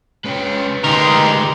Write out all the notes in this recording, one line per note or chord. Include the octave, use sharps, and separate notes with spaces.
G#3 C#4 B4 G5
D2 G#3 D#4 G4 A#4 C6